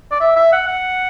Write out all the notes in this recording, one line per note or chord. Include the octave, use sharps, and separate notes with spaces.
D5
E5
E5
F#5
F#5